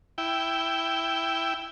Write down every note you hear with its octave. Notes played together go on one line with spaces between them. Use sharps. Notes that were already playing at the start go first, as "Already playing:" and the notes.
E4 G5